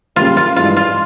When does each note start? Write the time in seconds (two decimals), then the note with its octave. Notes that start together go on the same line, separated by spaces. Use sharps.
0.16 C#3 G3 A#3 F4
0.37 F4
0.56 G2 E3 G#3 F4
0.77 F4